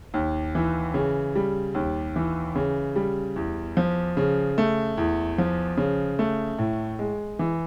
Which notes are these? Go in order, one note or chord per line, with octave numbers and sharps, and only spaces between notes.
D#2
E3
C#3
G3
D#2
E3
C#3
G3
E2
F3
C#3
A3
E2
F3
C#3
A3
A2
G#3
E3